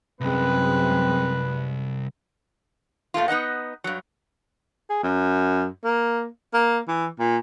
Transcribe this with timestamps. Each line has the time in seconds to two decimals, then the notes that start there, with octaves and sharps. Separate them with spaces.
0.20 C2 F#2 G#3 C4 B4
3.14 A#2 A3 A#3 F4
3.28 B3 D#4 D#5 F#5
3.84 G2 F#3
4.90 G#4
5.03 F#2
5.84 A#3
6.54 A#3
6.88 E3
7.19 A#2